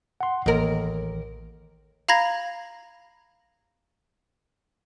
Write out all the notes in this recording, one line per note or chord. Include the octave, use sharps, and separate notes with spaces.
F#5 C6
A1 D#2 A#4
F5 A#5 B5 G#6 A#6